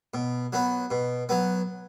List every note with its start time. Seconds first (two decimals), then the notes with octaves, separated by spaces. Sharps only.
0.14 B2
0.53 F#3 B3
0.91 B2
1.29 F#3 B3